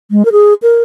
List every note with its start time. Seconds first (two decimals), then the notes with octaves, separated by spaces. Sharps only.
0.11 G#3
0.25 A#4
0.32 G#4
0.62 A#4